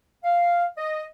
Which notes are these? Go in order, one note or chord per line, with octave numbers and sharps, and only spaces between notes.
F5
D#5